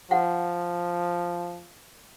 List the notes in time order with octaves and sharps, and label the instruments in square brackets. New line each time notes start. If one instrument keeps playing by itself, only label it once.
[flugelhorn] F3 [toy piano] F5 F#5